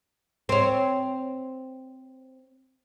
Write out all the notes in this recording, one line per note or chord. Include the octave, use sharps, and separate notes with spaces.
C4 C#5